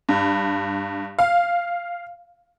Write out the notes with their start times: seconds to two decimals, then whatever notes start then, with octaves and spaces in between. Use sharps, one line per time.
0.09 G2
1.19 F5